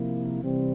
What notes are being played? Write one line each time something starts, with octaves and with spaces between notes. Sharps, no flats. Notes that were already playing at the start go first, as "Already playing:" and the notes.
Already playing: C3 F3 A#3 E4
C3 E3 G3 C4